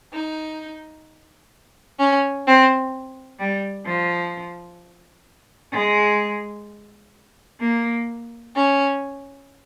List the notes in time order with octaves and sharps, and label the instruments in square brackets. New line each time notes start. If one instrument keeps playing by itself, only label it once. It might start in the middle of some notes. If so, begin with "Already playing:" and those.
[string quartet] D#4
C#4
C4
G3
F3
G#3
A#3
C#4